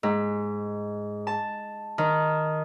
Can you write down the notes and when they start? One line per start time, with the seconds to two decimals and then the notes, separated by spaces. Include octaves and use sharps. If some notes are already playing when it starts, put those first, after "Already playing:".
0.03 G#2
1.27 A5
1.98 D#3